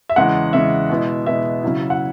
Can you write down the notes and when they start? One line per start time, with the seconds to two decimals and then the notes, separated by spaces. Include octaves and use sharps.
0.09 E5
0.16 E2 C#3 G#3 F#5
0.53 E2 C#3 G#3 E5
0.90 B2 G#3 B3 E4
1.26 B2 G#3 B3 E4 E5
1.63 C#3 F#3 E4
1.90 F#5